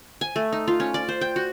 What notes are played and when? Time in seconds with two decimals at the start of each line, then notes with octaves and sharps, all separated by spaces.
0.21 G#5
0.36 A3
0.53 D#4
0.68 F4
0.80 C#4
0.94 D5
1.09 C5
1.21 G5
1.36 F#4